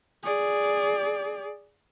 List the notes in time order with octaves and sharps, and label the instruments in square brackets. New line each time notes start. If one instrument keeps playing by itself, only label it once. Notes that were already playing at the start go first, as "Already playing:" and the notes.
[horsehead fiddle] G#4 D5